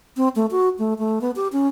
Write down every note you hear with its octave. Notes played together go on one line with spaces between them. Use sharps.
C4
A3
F#4
A3
A3
B3
G4
C#4